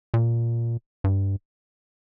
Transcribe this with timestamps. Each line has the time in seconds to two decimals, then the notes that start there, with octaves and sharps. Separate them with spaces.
0.14 A#2
1.04 G2